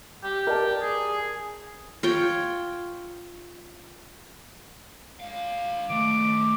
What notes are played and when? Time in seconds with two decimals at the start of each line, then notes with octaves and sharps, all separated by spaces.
0.24 G4
0.47 A#4 D5 A5
0.82 G#4
2.03 F4 C#5 G5
5.20 G#3 F5
5.90 D#3 A3 D6